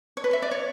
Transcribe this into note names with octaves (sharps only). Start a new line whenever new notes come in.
C#5
B4
E5
D5
C#5